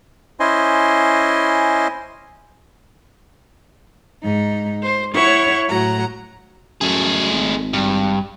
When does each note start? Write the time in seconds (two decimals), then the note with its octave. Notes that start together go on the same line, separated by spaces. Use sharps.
0.40 C#4 E4 C5 D#5 G#5 C6
4.23 G#2 D#4
4.83 C5
5.15 E4 C#5 F#5 C#6
5.69 A2 F#3 F#5 A#5
6.81 F#2 A3 G#4
7.31 G#1
7.73 G2